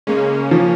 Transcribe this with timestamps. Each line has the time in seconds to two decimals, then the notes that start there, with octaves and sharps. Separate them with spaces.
0.07 C#3 G#3 A#3 C#4
0.51 F3